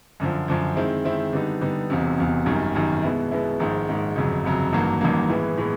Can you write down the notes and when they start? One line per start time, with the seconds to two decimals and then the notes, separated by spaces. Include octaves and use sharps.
0.20 F#2 D3 F3
0.48 F#2 D3 F3
0.76 D#3 G#3 C4 E4
1.05 D#3 G#3 C4 E4
1.33 D3 G3 B3 D#4
1.61 D3 G3 B3 D#4
1.90 E1 E2 C3
2.18 E1 E2 C3
2.46 G#1 F#2 D#3 G3
2.74 G#1 F#2 D#3 G3
3.03 B2 G#3 B3 E4
3.31 B2 G#3 B3 E4
3.59 A#1 G#2 D#3 G#3
3.88 A#1 G#2 D#3 G#3
4.16 G1 F2 C#3 F#3
4.45 G1 F2 C#3 F#3
4.73 A1 G2 D#3 F#3 A#3
5.01 A1 G2 D#3 F#3 A#3
5.29 A2 E3 G#3 B3 E4
5.57 A2 E3 G#3 B3